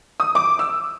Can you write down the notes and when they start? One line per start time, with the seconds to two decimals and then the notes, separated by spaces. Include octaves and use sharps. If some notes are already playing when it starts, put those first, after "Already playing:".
0.20 D#6
0.35 D6
0.59 E6